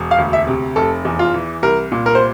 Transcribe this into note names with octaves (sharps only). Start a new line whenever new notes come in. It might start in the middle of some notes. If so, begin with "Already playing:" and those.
Already playing: E1
F5
D2
E5
C3
F1 A4
E2
F4
E3
C2 A#4
A#2
A#4
C5